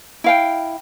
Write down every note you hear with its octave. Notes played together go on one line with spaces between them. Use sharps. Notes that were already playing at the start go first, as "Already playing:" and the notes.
E4 F5 G5